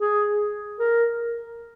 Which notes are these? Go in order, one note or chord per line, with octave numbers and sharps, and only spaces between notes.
G#4
A#4